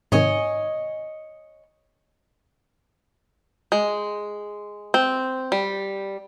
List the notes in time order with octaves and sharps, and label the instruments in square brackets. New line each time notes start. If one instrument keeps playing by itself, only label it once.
[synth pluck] G#2 C3 D#3 [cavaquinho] C#5 D#5 G#5
[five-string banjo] G#3
C4
G3